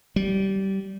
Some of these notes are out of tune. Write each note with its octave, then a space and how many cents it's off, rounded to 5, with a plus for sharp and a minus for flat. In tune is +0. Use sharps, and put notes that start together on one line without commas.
G3 -20